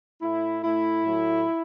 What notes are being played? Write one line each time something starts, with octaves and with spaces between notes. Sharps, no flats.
A2 A3 E4
A2 A3 E4
A2 F#3 A3